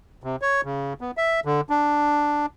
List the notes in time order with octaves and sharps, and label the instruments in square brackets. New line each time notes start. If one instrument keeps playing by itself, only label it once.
[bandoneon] C3
C#5
C#3
B3
E5
D3
D4